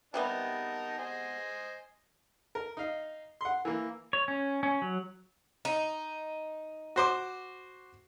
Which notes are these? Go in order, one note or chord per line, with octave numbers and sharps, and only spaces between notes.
C3 G3 B3 D#4 A#4 A5
C5 D#5 G#5
A#4
D#4 F5
F#5 C6
E3 A#3
C#5
C#4
C#4
F#3
D#4
F#4 C5 D6